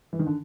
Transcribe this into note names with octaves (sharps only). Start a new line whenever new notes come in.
E3
D#3
D3